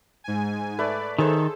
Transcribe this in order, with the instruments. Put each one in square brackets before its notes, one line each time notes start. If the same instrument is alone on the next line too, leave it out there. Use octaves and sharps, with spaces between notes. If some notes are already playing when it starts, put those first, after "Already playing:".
[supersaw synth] G#2 G#5
[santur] A3 B4 [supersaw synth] D5
[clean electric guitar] D#3 [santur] G#4 C5 [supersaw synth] A4